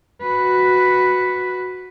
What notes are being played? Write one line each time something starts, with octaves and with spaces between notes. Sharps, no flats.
F#4 B4